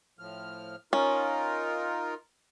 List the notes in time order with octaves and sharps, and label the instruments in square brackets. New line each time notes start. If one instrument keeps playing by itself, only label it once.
[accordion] A2 F3 F6
[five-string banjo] C#4 [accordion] D#4 F4 A#4